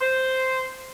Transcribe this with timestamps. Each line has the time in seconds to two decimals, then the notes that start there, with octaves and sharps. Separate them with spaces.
0.02 C5